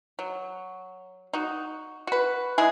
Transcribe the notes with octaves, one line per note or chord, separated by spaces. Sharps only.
F#3
D#4 F#4
F#4 B4
G#3 E4 G#4